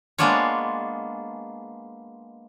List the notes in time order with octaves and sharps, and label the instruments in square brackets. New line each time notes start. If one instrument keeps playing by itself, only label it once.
[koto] G#3 A#3 B3 D4 F4 C#5